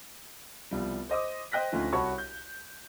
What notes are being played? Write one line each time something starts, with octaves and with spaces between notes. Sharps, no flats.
C2 B2 F3 G3
C5 D#5 D6 D#6
C5 D#5 G5 F#6 A#6 B6
D2 F3 C#4 D#4 F4
C2 F#4 C#5 A5 B5 C#6
G6